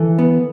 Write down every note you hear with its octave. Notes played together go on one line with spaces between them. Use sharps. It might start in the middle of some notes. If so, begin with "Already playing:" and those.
Already playing: E3 A4
B3